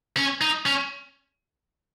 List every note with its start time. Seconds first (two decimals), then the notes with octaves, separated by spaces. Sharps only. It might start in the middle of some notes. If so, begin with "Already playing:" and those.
0.17 C#4
0.41 D#4
0.66 C#4